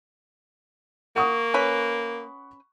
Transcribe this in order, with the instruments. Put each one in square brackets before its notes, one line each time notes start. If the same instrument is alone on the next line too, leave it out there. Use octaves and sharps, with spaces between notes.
[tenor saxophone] A#3 [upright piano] F#5 C#6 D#6
[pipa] C#4 B4